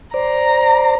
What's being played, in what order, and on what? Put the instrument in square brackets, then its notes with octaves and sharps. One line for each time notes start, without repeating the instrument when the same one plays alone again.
[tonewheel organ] C5 D5 [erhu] A#5